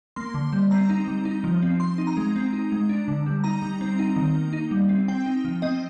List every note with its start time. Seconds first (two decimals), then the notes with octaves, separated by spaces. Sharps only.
0.16 A#3 C6
0.34 D3
0.53 G3
0.71 C4 A#5
0.89 D#4
1.07 G3
1.25 D#4
1.44 F3
1.62 C4
1.80 C4 C6
1.98 D#4
2.07 A#5
2.17 G#3
2.36 C4
2.53 D#4
2.72 G#3
2.89 D4
3.08 D3
3.26 G3
3.44 D#4 A#5
3.62 G3
3.81 C4
3.99 D#4
4.16 D#3
4.35 A#3
4.53 D#4
4.71 G3
4.89 C4
5.08 C4 G5
5.26 D#4
5.45 F3
5.62 C4 D#5